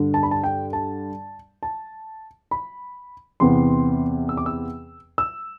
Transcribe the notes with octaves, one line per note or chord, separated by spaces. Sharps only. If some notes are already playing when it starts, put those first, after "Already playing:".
Already playing: G2 D3 G3
A5
B5
A5
G5
A5
A5
B5
E2 C3 E3 B3 C6
E6
D6
E6
E6